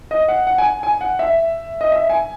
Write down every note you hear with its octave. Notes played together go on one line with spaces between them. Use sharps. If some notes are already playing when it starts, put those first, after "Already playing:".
D#5
F#5
F#5
G#5
G#5
F#5
E5
D#5
E5
G#5